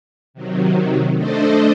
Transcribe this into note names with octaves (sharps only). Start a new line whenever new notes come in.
C3 D#3 F#3
A3 D4 A4 C5 D#5